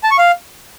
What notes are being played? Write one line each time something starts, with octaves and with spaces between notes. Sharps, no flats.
A5
C#6
F5